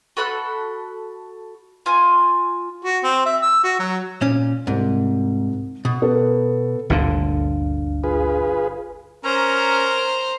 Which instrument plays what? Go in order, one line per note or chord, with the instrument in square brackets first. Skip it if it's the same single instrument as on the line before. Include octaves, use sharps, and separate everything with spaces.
[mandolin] F#4 A4 B5 F#6
F4 G#5
[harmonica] F#4
C4
E5
E6
F#4
F#3
[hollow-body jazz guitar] A#2 C#4
[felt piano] C2 [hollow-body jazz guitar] G#2
[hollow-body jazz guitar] B2
[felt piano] B3 A4 A#4
[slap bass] G1 A#2 D3 [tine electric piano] D2 D4 F5
[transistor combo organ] F4 G#4 B4
[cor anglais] C#4 [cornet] A#4 [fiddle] C5 A#5